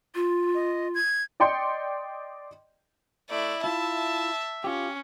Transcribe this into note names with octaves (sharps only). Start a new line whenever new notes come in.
F4
D#5
G#6
D5 D#5 G5 C6 G6 C#7
A3 E4 D5
E4 F4 E5 A5
C#4 F4 G4